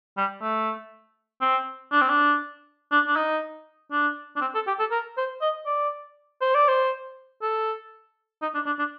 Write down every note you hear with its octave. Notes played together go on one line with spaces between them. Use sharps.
G3
A3
C4
D4
C4
D4
D4
D4
D#4
D4
D4
C4
A4
G4
A4
A#4
C5
D#5
D5
C5
D5
C5
A4
D#4
D4
D4
D4